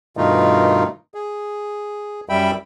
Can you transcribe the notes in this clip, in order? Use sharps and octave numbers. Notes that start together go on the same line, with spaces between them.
G2 B2 D#3 A3 D#4 F4
G#4
F#2 G3 E5 G5 B5